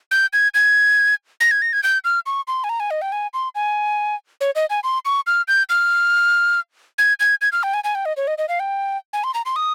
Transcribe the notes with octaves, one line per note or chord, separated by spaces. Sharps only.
G6
G#6
G#6
A#6
G#6
A#6
G#6
G6
F6
C#6
C6
G#5
A#5
G#5
D#5
G5
G#5
C6
G#5
C#5
D#5
G#5
C6
C#6
F6
G6
F6
G#6
G#6
G#6
F6
G5
G#5
G#5
G5
D#5
C#5
D#5
D#5
F5
G5
G#5
C6
A#5
C6
D#6